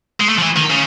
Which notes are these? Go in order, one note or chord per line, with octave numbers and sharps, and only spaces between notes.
G#3
A3
F3
E3
D#3
C#3